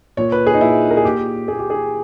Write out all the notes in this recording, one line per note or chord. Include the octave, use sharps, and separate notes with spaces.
A#2 C#5
B4
G#4
D#4
A#2 E4
A#4
G#4
A#2 G4
A#2 G#4
G4
G#4